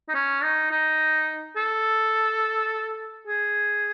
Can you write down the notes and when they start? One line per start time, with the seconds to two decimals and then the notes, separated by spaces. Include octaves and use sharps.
0.08 D#4
0.15 C#4
0.43 D#4
0.71 D#4
1.56 A4
3.27 G#4